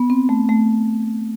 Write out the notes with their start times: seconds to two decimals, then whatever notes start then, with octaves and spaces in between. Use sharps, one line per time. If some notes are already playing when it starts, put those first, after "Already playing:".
Already playing: B3
0.10 C4
0.29 A3
0.49 A3